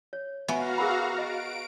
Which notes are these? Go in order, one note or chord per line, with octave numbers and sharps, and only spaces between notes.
C#5
B3 F#4 E5 F5 G#5 A#5 C#6
G#4 A#4 B5
B4 D#5 D7